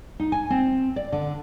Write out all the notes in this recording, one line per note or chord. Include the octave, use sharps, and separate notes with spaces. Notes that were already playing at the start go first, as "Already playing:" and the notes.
D#4
G#5
C4
D5
D3